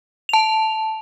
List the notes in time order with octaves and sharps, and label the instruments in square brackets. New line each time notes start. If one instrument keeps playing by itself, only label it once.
[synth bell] A5 F7